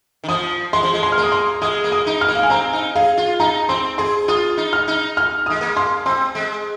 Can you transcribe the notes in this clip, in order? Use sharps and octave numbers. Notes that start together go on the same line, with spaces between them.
D#3
F3 D#6
G#3 C6
F3
G#3
C6
F6
A#3 D#6
C6
G#3 D#6
A#3
D#6
D#4
F6
A#3
F5
G#5
C4 A#5
D#4
G#4 F5
F4
D#4 A#5
C4 C6
G#4 C6
F4 D#6
D#4
F6
D#4
F6
D#6
G#3
A#3
C6
C4 C6
G#3